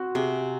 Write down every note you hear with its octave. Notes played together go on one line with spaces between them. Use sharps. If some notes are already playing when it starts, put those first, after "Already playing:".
Already playing: C4 F#4
C3 G#4